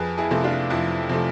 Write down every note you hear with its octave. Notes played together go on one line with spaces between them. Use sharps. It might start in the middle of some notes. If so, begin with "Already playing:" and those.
Already playing: F2 G#4 B4
E4 G#4
C3 F3 A3
D4 F4
F2 E4
C3 F3 A3